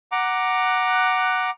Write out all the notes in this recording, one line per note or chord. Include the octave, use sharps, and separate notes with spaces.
F#5 A#5 D6 F#6